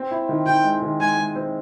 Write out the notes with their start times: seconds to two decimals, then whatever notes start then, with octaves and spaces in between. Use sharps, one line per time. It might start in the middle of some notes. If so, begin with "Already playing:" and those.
Already playing: C4
0.11 E4
0.29 D#3
0.46 D#3 G5
0.64 G#3
0.82 D#3
1.00 G#3 G#5
1.17 G#3
1.36 C4